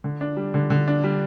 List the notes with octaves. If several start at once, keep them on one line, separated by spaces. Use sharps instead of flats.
D3
D4
G3
D3
D3
D4
G3